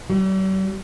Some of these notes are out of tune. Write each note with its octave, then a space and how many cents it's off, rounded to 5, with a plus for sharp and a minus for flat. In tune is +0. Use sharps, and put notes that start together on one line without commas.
G3 -45